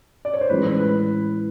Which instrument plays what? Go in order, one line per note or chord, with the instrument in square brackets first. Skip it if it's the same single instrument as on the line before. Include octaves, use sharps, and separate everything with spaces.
[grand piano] D5
C#5
C5
[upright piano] A2 E3 G#3 C#4 [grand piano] B4
[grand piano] B4